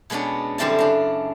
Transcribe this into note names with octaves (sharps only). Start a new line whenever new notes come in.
B2 G#3 B3 C#4 D4
F#2 D3 G3 C4 E4 A5
C#3 D4